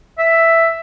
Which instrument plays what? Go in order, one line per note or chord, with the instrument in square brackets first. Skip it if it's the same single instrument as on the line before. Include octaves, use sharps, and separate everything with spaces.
[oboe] E5